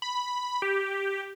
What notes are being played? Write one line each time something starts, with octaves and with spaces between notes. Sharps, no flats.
B5
G4